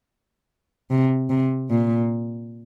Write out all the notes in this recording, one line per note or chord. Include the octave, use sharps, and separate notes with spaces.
C3
C3
A#2